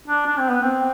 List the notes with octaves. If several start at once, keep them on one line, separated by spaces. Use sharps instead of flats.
D4
D4
C4
B3
C4